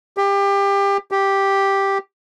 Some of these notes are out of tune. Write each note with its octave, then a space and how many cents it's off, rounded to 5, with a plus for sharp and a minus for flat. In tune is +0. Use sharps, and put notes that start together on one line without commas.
G4 +25
G4 +0